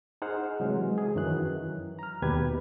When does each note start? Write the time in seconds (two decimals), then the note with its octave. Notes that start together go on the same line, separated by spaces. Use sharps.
0.22 D#4 G#4 C5 F#5 F6
0.60 C3 E3 F#3 G#3
0.98 G#4
1.16 F#2 D#3 E3 F#3 F#6
1.99 A#5 F6
2.22 D#2 B2 G4 B4 G#6